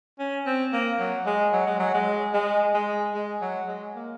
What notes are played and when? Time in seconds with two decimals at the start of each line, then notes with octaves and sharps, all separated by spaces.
0.19 C#4
0.46 C4
0.73 A#3
1.00 F#3
1.26 G#3
1.53 F#3
1.67 G#3
1.80 F#3
1.94 G#3
2.34 G#3
2.74 G#3
3.14 G#3
3.42 F#3
3.68 G#3
3.96 A#3